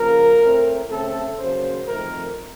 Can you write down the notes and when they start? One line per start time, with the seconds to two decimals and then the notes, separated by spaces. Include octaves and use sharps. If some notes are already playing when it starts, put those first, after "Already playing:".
Already playing: C#3 F3 A#3 A#4
0.39 A2 A3 C4
0.89 C#3 A3 C4 A4
1.39 C#3 F#3 A#3 C5
1.88 F2 D#3 A3 C4 A#4